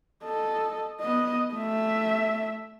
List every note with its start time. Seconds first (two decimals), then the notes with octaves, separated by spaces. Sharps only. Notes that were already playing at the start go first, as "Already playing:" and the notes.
0.24 A4 D#5
1.01 B3 D#5
1.54 A3 E5